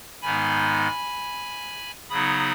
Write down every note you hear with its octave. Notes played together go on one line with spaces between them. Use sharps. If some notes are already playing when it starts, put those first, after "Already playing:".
G#2 D#3 G#3 B3 D#4 G#5 B5
C#3 F#3 B3 D#4 B5 D#6